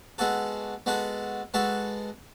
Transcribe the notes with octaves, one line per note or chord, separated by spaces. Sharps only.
G#3 B3 F#4 A4
G#3 B3 F#4 A4
G#3 B3 F#4 A4